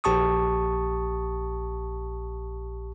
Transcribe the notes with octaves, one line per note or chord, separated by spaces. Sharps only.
A#1 G4 A5 C#6 D#6